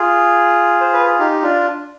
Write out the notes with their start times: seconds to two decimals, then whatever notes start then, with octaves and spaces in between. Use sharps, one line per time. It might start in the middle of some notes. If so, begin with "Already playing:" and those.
Already playing: F4 G#4
0.81 C5
0.93 B4
1.06 G#4
1.19 D#4 G4
1.42 D4 F4